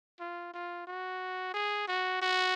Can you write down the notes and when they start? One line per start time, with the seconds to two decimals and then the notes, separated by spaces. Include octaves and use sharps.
0.20 F4
0.54 F4
0.87 F#4
1.54 G#4
1.88 F#4
2.22 F#4